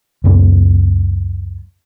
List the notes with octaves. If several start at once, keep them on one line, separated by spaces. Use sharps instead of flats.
C#2 F#2 B3